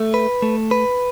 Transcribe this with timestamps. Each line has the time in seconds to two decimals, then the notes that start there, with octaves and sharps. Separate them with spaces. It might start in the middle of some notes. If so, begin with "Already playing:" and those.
Already playing: A3
0.14 B4
0.42 A3
0.71 B4